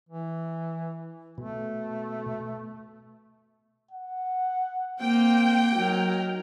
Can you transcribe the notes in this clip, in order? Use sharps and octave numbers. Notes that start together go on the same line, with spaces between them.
E3
B2 A3
F#5
A#3 C4 G5
F#3 D#4 A#4